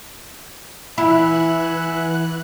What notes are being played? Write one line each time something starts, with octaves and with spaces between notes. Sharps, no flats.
E3 E4 E5 F#5 G#5 B5 F#6